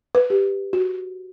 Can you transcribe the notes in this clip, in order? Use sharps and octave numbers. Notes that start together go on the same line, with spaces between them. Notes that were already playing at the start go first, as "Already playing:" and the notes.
B4
G4
F#4